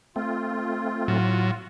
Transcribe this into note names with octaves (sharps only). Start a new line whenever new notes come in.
A3 C4 F4
A2 F#3